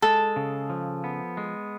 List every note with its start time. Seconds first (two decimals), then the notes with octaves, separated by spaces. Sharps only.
0.02 G#3 A4
0.36 C#3
0.70 F3
1.04 B3
1.37 G#3